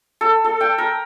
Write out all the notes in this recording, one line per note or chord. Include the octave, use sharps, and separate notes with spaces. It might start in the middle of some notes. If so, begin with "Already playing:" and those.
A4
A4
G5
A#4